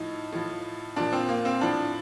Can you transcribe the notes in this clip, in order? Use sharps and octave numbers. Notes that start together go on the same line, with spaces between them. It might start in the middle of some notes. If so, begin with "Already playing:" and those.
Already playing: A2 F3 D#4
A2 F3
A#2 F3 D4
C4
A#3
C4
A2 F3 D4